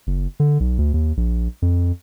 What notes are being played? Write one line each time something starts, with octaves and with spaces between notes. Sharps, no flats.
F#1
D3
B1
D2
D#2
A#1
F2